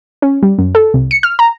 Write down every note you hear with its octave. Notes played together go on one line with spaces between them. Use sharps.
C#4
G3
F#2
A4
C2
C#7
F6
A#5